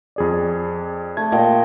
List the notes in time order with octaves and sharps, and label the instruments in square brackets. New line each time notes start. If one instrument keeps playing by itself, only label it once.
[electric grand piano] F2 G#4 D5
[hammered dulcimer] A3 [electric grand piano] G#6
[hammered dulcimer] A#2 G5 [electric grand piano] D#5